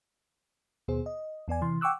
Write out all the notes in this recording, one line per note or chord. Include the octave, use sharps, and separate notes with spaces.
D#2 B2 B3 G#4 C5
D#5
E2 B3 D5 G#5
C3 E3 C6
F#5 G5 C#6 D6 E6 F#6